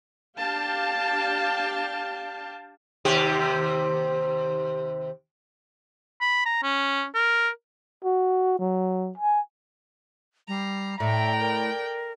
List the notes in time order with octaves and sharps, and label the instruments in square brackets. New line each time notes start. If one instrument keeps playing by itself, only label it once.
[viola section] D4 G4 F5 G5 A5
[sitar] D#2 C3 G4
[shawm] B5
A#5
C#4
A#4
[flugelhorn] F#4
F#3
G#5
[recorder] G3 [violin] A#5 C7
[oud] A2 [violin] D5 G5 [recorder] E5 [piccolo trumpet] A#5
[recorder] A#4